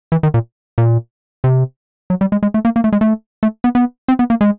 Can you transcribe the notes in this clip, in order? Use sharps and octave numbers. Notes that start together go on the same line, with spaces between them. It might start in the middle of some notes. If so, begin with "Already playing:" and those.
E3
D#3
A#2
A#2
C3
F#3
G3
G#3
G#3
A3
A#3
A#3
A3
G#3
A3
A3
B3
B3
C4
B3
A#3
G#3